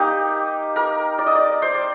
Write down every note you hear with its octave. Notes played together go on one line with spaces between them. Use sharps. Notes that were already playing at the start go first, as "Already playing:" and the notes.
Already playing: A#3 D#4 G4
A#4
D5
D#5
D5
C5
D5